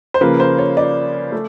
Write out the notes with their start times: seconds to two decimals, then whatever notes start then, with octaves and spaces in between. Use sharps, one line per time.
0.14 C5
0.21 C#3 F3 A#3 B4
0.40 C5
0.58 C#5
0.77 D5
1.32 A3